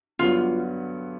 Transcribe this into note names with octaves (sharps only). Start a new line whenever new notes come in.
G2 D3 F#3 B3 F4